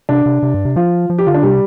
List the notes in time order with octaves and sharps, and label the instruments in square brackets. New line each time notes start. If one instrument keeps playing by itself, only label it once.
[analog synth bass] C3 [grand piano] D4
[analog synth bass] C3
C3
G2
C3
[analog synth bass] F3 [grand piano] F4
[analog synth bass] F3
[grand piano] G4
[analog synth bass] D3 [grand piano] F4
[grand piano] D4
[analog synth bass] C3 [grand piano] G3